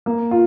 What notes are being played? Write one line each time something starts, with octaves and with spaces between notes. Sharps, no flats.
A#3
F4